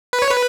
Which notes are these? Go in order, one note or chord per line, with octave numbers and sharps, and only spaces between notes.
B4
C#5
B4